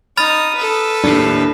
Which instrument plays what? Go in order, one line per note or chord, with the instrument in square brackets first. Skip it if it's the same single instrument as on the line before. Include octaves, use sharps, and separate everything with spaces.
[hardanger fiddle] D#4 D#6 [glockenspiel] B5 F6 A6
[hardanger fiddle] A4 B4
[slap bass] D#2 A2 [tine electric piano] D4